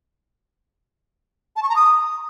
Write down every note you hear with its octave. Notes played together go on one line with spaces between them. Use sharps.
A5
C#6
A#5
D#6